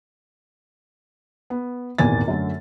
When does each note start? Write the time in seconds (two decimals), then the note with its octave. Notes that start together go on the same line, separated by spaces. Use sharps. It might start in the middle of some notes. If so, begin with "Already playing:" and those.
1.50 B3
1.98 D#1 G#1 E2 A#3 G#5 A6
2.28 F#2 D3 A3